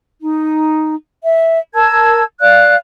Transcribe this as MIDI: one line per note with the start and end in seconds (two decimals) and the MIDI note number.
0.22 0.95 63
1.24 1.58 76
1.75 2.23 70
1.75 2.23 81
1.75 2.23 88
1.75 2.23 92
2.41 2.76 74
2.41 2.76 77
2.41 2.76 90